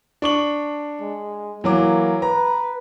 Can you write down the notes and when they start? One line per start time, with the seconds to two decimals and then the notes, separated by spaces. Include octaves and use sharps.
0.22 D4 C#6 F#7
1.01 G#3
1.64 E3 F#3 A#3 D6
2.22 B4 A#5